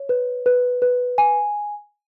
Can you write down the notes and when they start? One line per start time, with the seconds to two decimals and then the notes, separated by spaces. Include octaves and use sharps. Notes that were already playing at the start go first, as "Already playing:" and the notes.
Already playing: C#5
0.09 B4
0.46 B4
0.82 B4
1.18 G#5